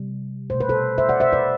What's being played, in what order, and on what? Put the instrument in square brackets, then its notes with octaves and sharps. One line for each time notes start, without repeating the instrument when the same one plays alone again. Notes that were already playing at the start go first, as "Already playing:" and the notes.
Already playing: [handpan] C3 G3
B2 A3 C5
B4
A4 C5
C5 E5
D5 F#5
C5 E5
B4 D5